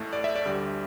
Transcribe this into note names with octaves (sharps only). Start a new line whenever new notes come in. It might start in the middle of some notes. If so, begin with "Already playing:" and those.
Already playing: A1 A2 A3
D5
E5
D5
D2 D3 G3